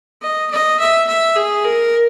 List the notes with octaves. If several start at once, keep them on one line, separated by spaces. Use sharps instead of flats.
D#5
D#5
E5
E5
G#4
A#4